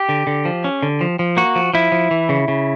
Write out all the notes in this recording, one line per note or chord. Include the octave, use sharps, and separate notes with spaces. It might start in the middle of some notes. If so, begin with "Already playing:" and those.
Already playing: G4
D3
D3
F3
C#4
D3
F3
F3
A#3 F#4
F3
F3 E4
F3
E3
C#3
C#3